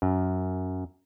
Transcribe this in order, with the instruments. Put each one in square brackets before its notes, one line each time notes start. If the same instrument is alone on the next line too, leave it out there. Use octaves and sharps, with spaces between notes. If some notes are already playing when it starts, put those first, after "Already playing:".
[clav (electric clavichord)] F#2